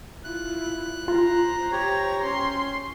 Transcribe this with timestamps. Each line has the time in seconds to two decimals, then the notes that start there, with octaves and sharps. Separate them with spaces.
0.24 E4 F4 F#6
1.08 F4 C5 A#5
1.72 G4 C#5
2.24 C#4 C6